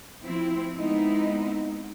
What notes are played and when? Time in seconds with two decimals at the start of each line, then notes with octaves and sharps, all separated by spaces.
0.22 F3 C4 E4
0.78 G#3 B3 C4 D#4 E4